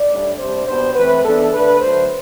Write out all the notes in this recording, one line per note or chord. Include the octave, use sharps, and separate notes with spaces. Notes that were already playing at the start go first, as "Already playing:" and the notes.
Already playing: D5
A2 G3 D4
C3 G3 D4 C5
B2 G3 B3 D4 C5
E3 A3 C4 B4
E3 B3 D4 A4
D3 A3 D4 B4
D3 F#3 A3 C5